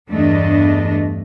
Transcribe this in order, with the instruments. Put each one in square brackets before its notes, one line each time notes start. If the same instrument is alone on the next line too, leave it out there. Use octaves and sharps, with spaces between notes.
[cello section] E2 G2 A3 D4 D#5